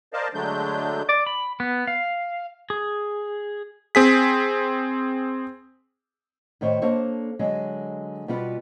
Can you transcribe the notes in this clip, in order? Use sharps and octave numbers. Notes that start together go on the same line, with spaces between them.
A#4 C5 D5 D#5 F5 A5
D3 F#3 G#3 A3 D4 G6
D5
B5
B3
F5
G#4
C4 G#4 B6
A2 D#3 C5 C#5
A#3 D4 A4 C5 C#5
D3 F#3 G#3
B2 G3 B3 F4 B4